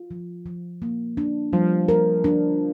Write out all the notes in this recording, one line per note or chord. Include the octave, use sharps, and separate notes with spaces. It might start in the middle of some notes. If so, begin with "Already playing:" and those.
Already playing: F4
F3
F3
A#3
D4
F3 G3
A#4
D4